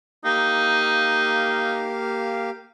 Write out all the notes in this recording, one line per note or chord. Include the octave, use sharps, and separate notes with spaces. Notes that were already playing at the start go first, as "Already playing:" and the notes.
A#3 D#4 G4 F5